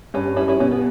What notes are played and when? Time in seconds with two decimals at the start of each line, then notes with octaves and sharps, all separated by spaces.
0.14 G2 C#4
0.37 G3 C#4 E4
0.48 C#4 E4
0.60 B2 C#4
0.71 B3